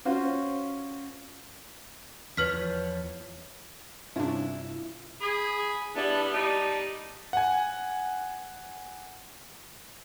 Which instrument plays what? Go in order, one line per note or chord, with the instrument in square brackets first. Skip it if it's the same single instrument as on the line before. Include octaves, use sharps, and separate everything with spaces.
[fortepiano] C#4 F4 F#4 C5
[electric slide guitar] E2 F3 C#5 [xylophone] B4 F6 B6
[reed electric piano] G2 C3 F4 [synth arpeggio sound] C#4 D4 [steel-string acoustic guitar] E4
[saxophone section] G#4 [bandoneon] B5
[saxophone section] G3 B3 [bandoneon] D4 E4 A5
[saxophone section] G3 D#4 [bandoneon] D5 A5
[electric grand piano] F#5 G#5